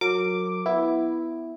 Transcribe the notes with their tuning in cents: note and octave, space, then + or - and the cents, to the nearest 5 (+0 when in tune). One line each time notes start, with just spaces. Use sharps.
F#3 -20 A#4 -30 D6 +0
B3 +5 E4 +0